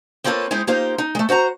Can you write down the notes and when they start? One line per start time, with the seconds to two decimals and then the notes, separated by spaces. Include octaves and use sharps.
0.24 A#3 C4 F4 A4 B4 C#5
0.51 G#3 C4 D#4 E4
0.67 A#3 D#4 F4 G4 C5
0.98 D#4
1.15 G#3 A3
1.29 F#4 C5 F#5 A#5